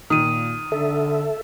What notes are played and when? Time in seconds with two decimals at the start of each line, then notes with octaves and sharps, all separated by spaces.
0.10 A#2 D#3 D#6 D#7
0.72 D3 A4 E5